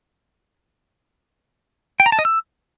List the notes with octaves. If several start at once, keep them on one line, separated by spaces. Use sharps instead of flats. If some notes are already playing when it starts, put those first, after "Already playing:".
G5
A#5
A5
D#5
E6